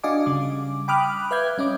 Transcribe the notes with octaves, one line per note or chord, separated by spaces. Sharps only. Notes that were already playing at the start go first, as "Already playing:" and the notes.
D4 F#4 D#5 F5 G#5 D6
C#3 G3 D6
G5 B5 D6 D#6 F6 F#6
B4 E5 F5 G6 G#6
G3 C#4 D#5 D6